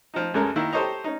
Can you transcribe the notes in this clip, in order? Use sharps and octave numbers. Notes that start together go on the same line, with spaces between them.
F3 D#4
C#2 F#2 G#3 C#4 A4 A#4
D#3 A#3 E4
G4 A4 C5 C#5 D#5 A#5
C#4 D#4